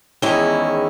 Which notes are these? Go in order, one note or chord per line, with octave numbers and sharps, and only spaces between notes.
E2 D#3 G#3 C#4 E4